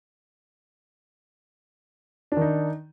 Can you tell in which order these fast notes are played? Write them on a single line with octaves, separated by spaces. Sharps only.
D4 D#3 D#4